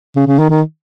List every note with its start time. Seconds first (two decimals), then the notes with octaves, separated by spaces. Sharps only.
0.16 C#3
0.27 C#3
0.39 D#3
0.50 D#3